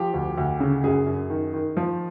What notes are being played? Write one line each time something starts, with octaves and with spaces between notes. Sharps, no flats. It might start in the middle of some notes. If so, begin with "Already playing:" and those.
Already playing: F3 G4
D2
D2
C#3
F#2 G#4
F#2
D#3
D#3
F3